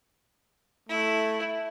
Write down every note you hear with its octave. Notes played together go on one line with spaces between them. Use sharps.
A3 E4